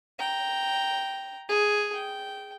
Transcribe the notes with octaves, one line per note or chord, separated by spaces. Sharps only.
G5 A#5
G#4
G5